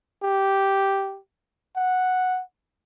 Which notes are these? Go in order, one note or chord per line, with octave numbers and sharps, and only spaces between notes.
G4
F#5